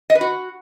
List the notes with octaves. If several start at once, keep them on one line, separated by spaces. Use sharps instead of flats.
D#5
B4
F#4